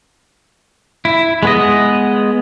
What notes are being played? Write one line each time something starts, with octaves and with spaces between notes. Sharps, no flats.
E4
G#3 B3 D#5